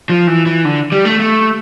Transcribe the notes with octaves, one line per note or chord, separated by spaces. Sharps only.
F3
E3
E3
D3
G3
A3
A3